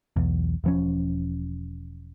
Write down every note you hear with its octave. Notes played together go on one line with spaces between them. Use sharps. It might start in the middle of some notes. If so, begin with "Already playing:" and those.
B1 E2
E1 F3 C#4